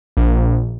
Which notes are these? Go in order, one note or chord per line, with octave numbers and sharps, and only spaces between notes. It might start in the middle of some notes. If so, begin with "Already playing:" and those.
A#1